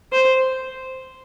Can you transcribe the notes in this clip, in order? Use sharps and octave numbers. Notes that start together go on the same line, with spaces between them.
C5